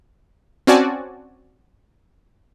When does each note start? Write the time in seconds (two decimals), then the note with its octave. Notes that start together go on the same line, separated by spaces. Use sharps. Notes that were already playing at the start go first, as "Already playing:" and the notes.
0.67 C4 C#4 F#4 D5 G#5 A5